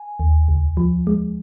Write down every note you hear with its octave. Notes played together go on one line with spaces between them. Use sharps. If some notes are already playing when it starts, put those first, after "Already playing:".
Already playing: G#5
D#2
C#2
F3
G#3